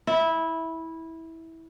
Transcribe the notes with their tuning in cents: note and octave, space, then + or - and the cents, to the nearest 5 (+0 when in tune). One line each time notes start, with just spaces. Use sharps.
E4 -15